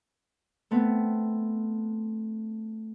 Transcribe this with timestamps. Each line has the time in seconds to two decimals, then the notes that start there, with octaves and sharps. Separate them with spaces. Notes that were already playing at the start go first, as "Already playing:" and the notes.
0.71 A3 B3 C4